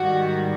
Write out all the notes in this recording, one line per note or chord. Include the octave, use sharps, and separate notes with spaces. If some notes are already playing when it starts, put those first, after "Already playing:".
Already playing: G#2 D#3 G3 F#4